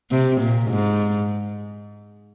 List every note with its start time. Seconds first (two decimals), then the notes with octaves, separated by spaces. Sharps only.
0.11 C3
0.41 A#2
0.71 G#2